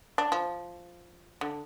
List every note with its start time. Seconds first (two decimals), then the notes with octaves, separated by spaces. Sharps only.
0.18 D4
0.32 F3
1.41 D3